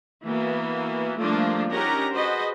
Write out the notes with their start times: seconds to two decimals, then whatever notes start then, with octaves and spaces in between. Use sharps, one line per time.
0.24 E3 A#3 B3 F#4
1.18 F3 G3 A3 A#3 D4 F4
1.70 C#4 D#4 G4 A#4 F#5 A#5
2.12 F#4 G#4 B4 C5 D#5